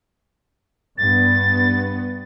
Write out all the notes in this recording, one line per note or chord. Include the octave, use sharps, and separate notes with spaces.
G2 B3 A6